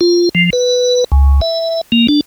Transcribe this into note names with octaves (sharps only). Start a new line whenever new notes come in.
F4
F3
B4
C#2
E5
A#3
D4